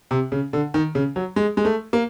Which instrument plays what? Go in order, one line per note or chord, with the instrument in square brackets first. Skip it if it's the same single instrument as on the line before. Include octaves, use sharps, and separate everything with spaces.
[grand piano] C3
C#3
D3
D#3
C#3
F#3
G#3
G#3
A3
A#3